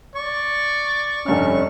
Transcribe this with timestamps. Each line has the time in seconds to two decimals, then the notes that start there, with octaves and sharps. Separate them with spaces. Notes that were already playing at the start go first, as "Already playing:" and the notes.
0.15 D5 C#6
1.26 F1 G2 C#4 F6